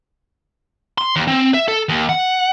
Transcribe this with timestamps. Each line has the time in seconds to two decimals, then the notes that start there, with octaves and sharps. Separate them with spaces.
0.98 C6
1.16 D#2
1.28 C4
1.54 E5
1.68 A4
1.89 D#2
2.09 F#5